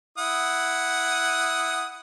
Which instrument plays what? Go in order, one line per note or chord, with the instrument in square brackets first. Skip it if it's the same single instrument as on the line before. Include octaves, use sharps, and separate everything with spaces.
[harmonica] E4 F#5 D#6